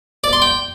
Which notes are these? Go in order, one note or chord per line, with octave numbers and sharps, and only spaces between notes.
D5
C6
G5